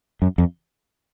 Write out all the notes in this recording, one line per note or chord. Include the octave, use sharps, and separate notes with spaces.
F#2
F2